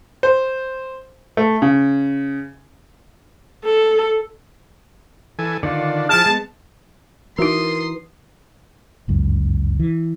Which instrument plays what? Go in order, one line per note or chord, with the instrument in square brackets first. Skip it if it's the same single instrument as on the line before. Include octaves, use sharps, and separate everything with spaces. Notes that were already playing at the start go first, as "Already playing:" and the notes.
[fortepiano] C5
A3
C#3
[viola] A4
[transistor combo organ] E3 A4 G#5
[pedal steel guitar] D3 D#3 F4 [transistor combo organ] D4
[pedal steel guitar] F3 E4 F6 [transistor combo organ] G#4 [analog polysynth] A5
[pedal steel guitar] G#3 B3
[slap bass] E3 [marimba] D#4 F#4 [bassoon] A#4 [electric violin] C6 D#6
[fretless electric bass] G1 C#2 F#2
E3